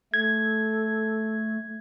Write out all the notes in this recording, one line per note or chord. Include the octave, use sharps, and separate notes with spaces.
A3 A4 G#6